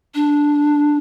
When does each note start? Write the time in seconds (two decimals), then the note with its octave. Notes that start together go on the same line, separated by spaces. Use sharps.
0.15 D4